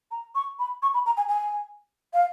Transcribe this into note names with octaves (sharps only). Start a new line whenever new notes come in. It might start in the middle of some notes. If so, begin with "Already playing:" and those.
A#5
C#6
B5
C#6
B5
A#5
G#5
G#5
F5